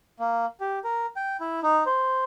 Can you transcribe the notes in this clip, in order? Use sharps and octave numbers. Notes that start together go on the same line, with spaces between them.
A#3
G4
A#4
G5
E4
D#4
C5